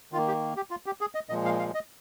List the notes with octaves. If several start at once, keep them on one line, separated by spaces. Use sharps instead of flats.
D#3 F4
A#3
G4
G4
F4
G4
G#4
D#5
A#2 F3 G#3 D#5
F5
F5
D#5